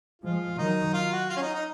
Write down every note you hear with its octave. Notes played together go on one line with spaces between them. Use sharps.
F3 G#3 F4
D#3 F#3 D#4
F4
F#4
F4
C#4
D#4
D#4